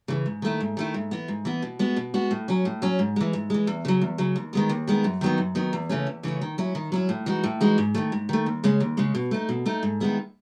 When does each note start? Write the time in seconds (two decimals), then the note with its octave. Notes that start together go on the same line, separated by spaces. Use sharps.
0.08 C#3 E3
0.26 G#2
0.42 D#3 A3 E4
0.60 G#2
0.77 D#3 A3 E4
0.94 G#2
1.11 E3 B3
1.28 G#2
1.45 E3 B3
1.62 B2
1.79 G#3 B3 F#4
1.96 B2
2.14 G#3 B3 F#4
2.31 A2
2.48 F#3 C#4
2.65 A2
2.82 F#3 C#4
2.99 G#2
3.16 E3 G#3
3.33 G#2
3.50 E3 G#3
3.67 E2
3.85 C#3 F#3
4.01 E2
4.18 C#3 F#3
4.36 D#2
4.53 D#3 G#3 B3
4.69 D#2
4.87 D#3 G#3 B3
5.04 F#2
5.21 D#3 F#3 B3 D#4
5.38 F#2
5.55 D#3 F#3 B3 D#4
5.73 E2
5.89 C#3 E3 A3 C#4
6.07 E2
6.23 C#3 E3 A3 C#4
6.41 D#3
6.58 F#3 C#4 E4
6.75 D#3
6.92 F#3 C#4 E4
7.09 A2
7.26 E3 G#3 D#4 F#4
7.44 A2
7.61 E3 G#3 D#4 F#4
7.78 G#2
7.94 D#3 A3
8.12 G#2
8.29 D#3 A3
8.46 D#2
8.64 C#3 G#3 C#4
8.80 D#2
8.97 C#3 G#3 C#4
9.15 B2
9.31 A3 D#4
9.49 B2
9.66 A3 D#4
9.83 G#2
10.00 D#3 G#3 B3 E4